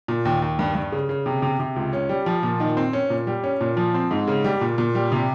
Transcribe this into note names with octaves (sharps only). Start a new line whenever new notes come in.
A#2
D#2
D#2
G2
G2
C#3
C#3
C3
C3
C3
C#2
C#4
G3
F3
A#2
D#3
C4
C#4
A#2
G3
C#4
A#2
F3
C4
G#2
C#3
G3
A#2
A#2
G3
C3